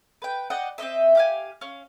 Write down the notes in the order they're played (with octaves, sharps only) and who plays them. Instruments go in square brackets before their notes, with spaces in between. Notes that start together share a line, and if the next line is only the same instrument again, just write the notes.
[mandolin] B4 G5
D5 D#5 F#5 G5
C4 C#4 D#5 E5
G4 F5 G#5
C#4 F5